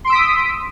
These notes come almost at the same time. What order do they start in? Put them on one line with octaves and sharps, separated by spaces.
C6 D7 E6 B6 D#6